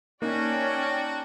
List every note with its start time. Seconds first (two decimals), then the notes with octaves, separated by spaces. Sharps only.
0.22 A#3 C#4 D#4 F#4 D5 G5 A5